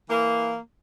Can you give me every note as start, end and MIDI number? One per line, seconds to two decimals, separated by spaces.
0.09 0.58 52
0.09 0.58 58